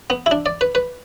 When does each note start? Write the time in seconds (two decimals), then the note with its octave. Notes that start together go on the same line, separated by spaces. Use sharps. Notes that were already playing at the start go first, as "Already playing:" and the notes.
0.10 B3
0.26 E4
0.31 D4
0.46 D5
0.61 B4
0.75 B4